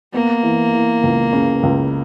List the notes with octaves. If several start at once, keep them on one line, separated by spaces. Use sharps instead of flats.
A#3 B3
E3
E3
C#2
C#3
C#2